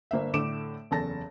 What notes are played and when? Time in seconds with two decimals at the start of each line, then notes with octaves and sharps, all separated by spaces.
0.11 G1 A#3 C5 E5
0.34 A2 D3 A3 D6 D7 E7
0.91 F#1 E2 A4 A5 A#6